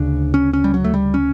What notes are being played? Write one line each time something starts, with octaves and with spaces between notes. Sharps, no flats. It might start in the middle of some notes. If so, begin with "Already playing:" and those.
Already playing: D2 C#3 D4
C#4
C#4
G3
F#3
A3
G3
C#4